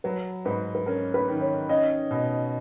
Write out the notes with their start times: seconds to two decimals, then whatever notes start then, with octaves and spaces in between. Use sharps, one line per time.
0.04 F#3 B4
0.45 G#2 B4
0.75 B4
0.86 C#4 A#4
1.14 B4
1.28 D#3
1.41 C#5
1.69 C#4 D#5
2.11 B2